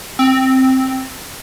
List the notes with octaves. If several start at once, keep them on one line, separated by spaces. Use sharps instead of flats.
C4